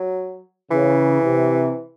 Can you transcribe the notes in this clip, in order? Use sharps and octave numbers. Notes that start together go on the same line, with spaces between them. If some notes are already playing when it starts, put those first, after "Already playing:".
Already playing: F#3
C#3 E3
C3